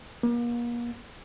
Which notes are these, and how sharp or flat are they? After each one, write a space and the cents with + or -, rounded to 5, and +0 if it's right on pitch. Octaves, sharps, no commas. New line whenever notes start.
A#3 +40